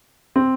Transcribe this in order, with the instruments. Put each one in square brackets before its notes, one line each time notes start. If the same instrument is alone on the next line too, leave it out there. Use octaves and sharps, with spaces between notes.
[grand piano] C4